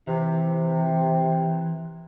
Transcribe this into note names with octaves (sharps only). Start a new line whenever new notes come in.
C3 E3